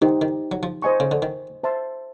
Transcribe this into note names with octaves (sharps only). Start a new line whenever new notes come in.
D#3 D#4 G4 C5
D#3
F#3
F3
C5 D#5 G#5 C#6
C#3
D3
D#3
C5 E5 A5 C6